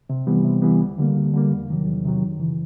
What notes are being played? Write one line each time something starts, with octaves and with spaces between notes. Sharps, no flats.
C3
E3 G3 B3
C3
E3 G3 B3
D2
D3 G3 A#3
D2
D3 G3 A#3
E2
C3 D#3 F#3
E2
C3 D#3 F#3
F#2
C#3 E3